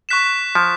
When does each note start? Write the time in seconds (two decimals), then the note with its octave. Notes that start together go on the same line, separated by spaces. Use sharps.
0.09 C#6 F#6 B6 E7
0.55 F3